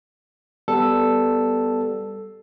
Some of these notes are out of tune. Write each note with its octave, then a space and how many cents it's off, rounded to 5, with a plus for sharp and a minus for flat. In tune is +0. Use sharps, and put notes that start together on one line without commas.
G3 +0 B3 +0 A4 +0